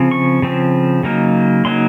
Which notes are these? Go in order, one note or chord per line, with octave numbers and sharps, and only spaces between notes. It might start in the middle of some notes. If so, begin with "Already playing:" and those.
Already playing: C#3 F3 C4
C#6
C#3 F3 C4
C#3 F#3 A#3 D#4
C#3 F#3 A#3 D#4 C6